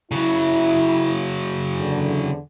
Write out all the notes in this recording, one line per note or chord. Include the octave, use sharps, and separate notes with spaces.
C#3 F#3 E4
E2 D3